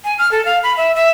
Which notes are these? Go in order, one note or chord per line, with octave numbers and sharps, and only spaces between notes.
G#5
F6
A4
F5
B5
E5
E5